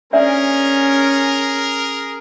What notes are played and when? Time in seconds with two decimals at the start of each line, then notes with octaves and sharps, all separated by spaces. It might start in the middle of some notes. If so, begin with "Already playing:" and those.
0.13 C#4 D4 G#4 A#4 D5 E5